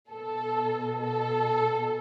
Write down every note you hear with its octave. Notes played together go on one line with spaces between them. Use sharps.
B2 A4
A4